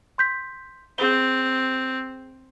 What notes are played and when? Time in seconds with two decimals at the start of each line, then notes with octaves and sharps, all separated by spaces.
0.18 C6 G6 B6
0.98 C4 G#4 G7